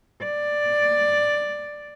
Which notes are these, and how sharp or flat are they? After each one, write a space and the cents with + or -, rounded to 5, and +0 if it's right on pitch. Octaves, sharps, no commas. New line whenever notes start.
D5 +5